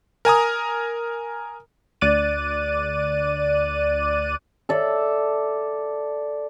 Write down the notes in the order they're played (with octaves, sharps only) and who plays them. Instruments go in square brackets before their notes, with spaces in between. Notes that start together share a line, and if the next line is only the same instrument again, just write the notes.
[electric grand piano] A#4 G#5 A#5 D#6
[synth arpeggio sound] D2 D5 D6 F#6 A6 D#7
[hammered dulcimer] A4 D5 E5